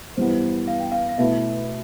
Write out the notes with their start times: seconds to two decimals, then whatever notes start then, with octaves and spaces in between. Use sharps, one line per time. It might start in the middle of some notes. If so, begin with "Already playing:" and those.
0.17 G2 E3 G3 B3 C5
0.68 F5
0.80 G5
0.92 F5
1.09 F5
1.18 B2 A3 E4 B4 E5